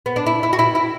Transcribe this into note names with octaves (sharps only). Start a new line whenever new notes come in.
B3
D4
E4
E4
F#4
E4
E4